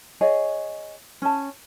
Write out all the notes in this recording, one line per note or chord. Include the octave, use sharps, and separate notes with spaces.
G#4 C#5 D#5
C#4 A5